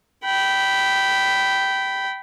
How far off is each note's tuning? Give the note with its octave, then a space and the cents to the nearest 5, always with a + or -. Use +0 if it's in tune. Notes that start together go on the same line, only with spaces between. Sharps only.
G5 -15 B5 +0